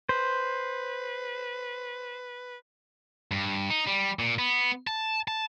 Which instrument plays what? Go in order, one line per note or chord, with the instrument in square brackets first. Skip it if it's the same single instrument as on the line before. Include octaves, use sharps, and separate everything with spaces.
[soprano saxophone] B4 [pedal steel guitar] C5
[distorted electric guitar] G2
D#4
G3
A#2
B3
A5
A5